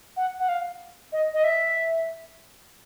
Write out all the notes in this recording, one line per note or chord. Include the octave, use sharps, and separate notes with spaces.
F#5
F#5
F5
D#5
D#5
E5